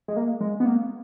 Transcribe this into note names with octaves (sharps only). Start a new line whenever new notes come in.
G#3
A#3
G#3
B3
A#3